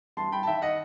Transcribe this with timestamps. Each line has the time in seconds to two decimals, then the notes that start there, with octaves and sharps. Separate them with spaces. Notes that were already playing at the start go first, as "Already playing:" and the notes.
0.17 G2 A5 C6
0.32 G5 B5
0.43 A5
0.47 D#3 E5 G5
0.62 D#5 F#5